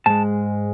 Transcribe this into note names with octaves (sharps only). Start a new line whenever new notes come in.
G#2 G#3 A5